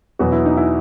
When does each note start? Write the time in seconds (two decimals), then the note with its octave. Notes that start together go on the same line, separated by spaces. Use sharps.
0.19 E2 B2 F#3 B3 F#4
0.32 E4
0.45 D#4
0.57 E4